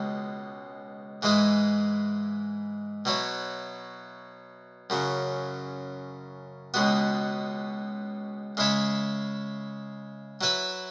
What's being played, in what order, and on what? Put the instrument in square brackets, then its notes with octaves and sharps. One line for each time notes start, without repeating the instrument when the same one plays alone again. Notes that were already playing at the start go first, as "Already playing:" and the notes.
Already playing: [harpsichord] C#2 B2 G#3
G#2 E3 G#3 E4 G#4
B2 F#3 E4 C#5
F#2 C#3 F#3
C#2 B2 G#3 B3 F#4
C#3 G#3 E4 C#5 E5
F#3 E4 B4 E5